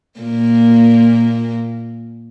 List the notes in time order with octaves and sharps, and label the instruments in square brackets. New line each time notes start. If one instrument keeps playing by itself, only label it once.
[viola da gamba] A#2 A#3